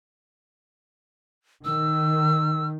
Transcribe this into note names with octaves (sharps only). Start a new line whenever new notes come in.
D#3 E6